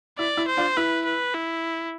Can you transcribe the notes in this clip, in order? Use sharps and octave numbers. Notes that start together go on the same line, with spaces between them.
E4 D5
E4
C5
D4 F4
E4 B4
B4
E4